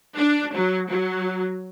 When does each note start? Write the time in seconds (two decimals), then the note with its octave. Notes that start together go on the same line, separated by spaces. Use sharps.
0.17 D4
0.55 F#3
0.89 F#3